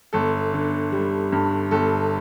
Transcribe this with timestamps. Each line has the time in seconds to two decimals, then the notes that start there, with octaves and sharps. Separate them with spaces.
0.13 G1 A4
0.53 D3
0.92 G3
1.32 G2
1.71 G1 A4